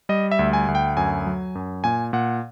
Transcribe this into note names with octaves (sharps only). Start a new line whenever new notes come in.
G3 D#5
E5
D2
G#5
D2
G5
F#2 G#5
F#3
F#2
A#2 G#5
A#2 F#5